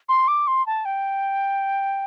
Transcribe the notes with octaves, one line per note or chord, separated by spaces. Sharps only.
C6
D6
C6
A5
G5